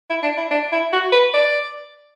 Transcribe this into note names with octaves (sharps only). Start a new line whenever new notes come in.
E4
D4
E4
D4
E4
F#4
B4
D5